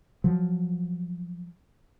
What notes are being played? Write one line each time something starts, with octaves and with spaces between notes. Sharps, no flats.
F3 F#3